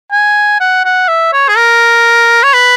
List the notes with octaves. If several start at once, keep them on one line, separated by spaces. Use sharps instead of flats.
G#5
F#5
F#5
E5
C#5
G#4
A#4
C#5
B4